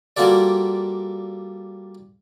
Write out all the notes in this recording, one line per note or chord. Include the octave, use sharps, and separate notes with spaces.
G3 A#3 F4 F#4 A4 D5